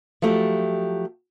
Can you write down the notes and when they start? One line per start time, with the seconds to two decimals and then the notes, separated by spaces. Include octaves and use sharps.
0.22 F3 F#3 A3 G4